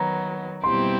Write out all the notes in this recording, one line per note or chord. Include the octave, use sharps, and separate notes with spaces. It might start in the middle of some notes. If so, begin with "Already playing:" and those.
Already playing: D#3 F#3 B3 A#5
B2 G3 C4 E4 G4 C6